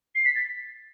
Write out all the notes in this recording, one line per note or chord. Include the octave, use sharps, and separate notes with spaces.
C7
B6
A6